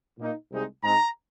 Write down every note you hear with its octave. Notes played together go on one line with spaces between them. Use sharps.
A#2 A#3 D#4
C2 C3 G#3 D#4
G#2 G#3 C4 D#4 A#5